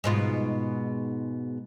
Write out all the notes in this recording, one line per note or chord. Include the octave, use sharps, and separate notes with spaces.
G#2 B2 F4